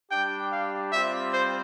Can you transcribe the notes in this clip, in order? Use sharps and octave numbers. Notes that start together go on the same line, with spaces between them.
G3 D4 G4 G5
F5
G3 C4 F4 E5
C5